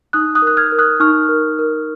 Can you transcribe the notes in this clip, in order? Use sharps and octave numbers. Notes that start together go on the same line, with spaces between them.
D#4 D#6 F#6
D#6 F#6
A#4
F#6
F6 G#6
A#4
D#6 F#6
D#4 C#6 F6
A#4
A#4